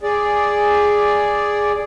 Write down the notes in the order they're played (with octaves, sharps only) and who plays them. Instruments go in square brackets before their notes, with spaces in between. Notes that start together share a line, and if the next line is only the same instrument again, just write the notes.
[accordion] G#4 D5